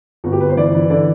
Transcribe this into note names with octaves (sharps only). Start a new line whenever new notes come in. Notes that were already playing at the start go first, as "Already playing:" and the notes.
G1 F#4
G4
G1 B4
C5
E3 D5
E3
D3 D5